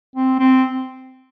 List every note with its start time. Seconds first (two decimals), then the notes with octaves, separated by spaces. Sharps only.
0.16 C4
0.39 C4